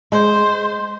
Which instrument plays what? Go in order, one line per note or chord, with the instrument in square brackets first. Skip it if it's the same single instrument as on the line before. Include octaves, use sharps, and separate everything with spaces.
[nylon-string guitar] G#3 [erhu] C5